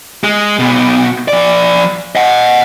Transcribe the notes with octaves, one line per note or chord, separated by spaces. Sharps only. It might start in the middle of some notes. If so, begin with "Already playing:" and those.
G#3
B1 B2
F3 D5
D#5 F#5